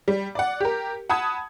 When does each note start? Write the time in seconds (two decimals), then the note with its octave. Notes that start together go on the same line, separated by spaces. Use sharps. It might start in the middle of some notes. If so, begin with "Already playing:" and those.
0.08 G3
0.35 D5 F#5
0.61 G4 A#4
1.09 F#5 A5 B5 D#6 G#6